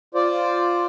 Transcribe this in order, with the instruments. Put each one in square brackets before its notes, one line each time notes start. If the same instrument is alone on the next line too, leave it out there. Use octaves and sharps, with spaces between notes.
[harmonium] F4 C5 D5